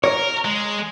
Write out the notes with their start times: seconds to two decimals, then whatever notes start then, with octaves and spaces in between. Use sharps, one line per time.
0.04 A#4 C#5
0.45 G#3